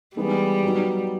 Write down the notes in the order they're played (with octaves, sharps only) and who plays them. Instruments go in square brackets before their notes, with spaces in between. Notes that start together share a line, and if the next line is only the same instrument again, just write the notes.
[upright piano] E3 G#3 B3 D#4 [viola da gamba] G3
[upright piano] F#3 B3 D#4